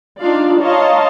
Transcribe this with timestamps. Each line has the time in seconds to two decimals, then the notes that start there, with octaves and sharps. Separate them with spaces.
0.19 D4 D#4 F4 D5 F5
0.62 C#5 D#5 F5 A5 A#5 C6